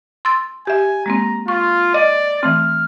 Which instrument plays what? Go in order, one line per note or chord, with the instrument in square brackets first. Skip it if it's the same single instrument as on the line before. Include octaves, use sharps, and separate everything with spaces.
[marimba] C6 E6 A6
[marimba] G4 E5 [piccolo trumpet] G#5
[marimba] G#3 A#3 C4 [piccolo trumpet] A#5
[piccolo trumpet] F4 [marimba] C#6
[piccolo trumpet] D5 [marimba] D#5
[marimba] E3 A3 C4 [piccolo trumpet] F6